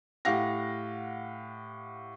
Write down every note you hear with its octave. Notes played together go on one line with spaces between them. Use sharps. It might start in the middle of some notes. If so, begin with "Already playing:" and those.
A2 G4 F5 F#5 A#6